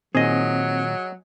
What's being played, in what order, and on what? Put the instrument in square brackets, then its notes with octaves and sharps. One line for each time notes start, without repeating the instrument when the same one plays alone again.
[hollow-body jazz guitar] A#2 D#3 [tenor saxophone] F#3 [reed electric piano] C4 [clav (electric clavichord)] G#4 D#5